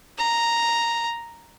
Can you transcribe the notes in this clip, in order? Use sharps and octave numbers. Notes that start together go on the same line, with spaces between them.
A#5